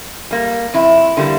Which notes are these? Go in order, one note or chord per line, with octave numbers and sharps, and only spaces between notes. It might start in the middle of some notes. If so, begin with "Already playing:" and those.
G3 A#3
F2 E4
D3 G3 A#3